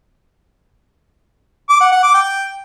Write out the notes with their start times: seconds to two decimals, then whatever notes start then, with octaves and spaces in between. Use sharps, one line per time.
1.70 D6
1.81 F#5
1.92 F#5
2.03 D6
2.14 G5